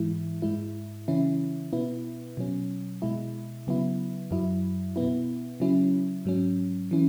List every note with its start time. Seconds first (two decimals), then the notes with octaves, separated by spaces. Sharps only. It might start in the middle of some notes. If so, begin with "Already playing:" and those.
Already playing: G#2 E3 G#3 E4
0.42 G#2 G#3 E4
1.08 C#3 E3 C#4 E4
1.73 B2 B3 E4
2.37 B2 F#3 C#4
3.02 B2 G#3 E4
3.67 C#3 F#3 B3 E4
4.31 F#2 F#3 E4
4.96 B2 B3 E4
5.60 C#3 F#3 C#4 E4
6.25 G#2 F#3 C#4
6.91 E3 C#4 E4